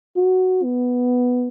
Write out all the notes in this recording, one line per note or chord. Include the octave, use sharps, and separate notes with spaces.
F#4
B3